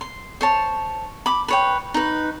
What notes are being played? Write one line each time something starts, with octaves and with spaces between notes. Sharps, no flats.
C6
C5 C#5 A5
B5 D6
B4 C#5 G5
D#4 B4